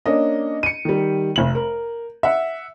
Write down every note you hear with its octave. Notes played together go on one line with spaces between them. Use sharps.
A#3 C#4 D4 D#5
C#7 D#7
D#3 G3
F1 F#7
A#4
E5 F#5